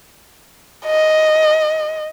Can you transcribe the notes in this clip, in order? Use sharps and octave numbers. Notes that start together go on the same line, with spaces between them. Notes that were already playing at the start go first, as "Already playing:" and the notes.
D#5